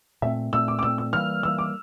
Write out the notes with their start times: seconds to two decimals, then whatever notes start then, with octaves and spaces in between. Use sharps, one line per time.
0.22 A#2 A3 C4 E5
0.53 A#2 A3 C4 E6
0.68 D6
0.79 D6
0.83 A#2 A3 C4 E6
0.98 E6
1.13 E3 G3 A#3 F6
1.43 E3 G3 A#3 E6
1.58 D6